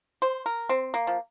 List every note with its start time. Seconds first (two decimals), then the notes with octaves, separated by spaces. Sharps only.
0.22 C5
0.46 A#4
0.69 C4
0.94 A#3
1.07 F3